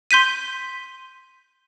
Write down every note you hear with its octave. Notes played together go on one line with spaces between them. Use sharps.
C6 G6 B6 D#7